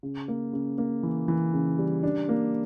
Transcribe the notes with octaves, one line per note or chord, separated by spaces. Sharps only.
C#3
A#3
C#3
A#3
E3
E3
C#3
G3
D4
A#3